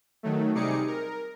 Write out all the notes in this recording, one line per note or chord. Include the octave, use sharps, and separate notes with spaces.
D#3 F#3 A3
C3 G3 D#4 G#4 D6 C#7
A#4